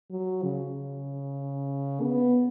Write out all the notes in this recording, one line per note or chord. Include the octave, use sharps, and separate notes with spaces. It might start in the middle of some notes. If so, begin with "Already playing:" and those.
F#3
C#3
B3